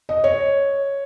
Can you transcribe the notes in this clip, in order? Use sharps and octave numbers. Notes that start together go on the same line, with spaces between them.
D#5
C#5